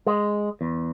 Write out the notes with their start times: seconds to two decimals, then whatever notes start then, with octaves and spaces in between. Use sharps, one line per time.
0.07 G#3
0.61 E2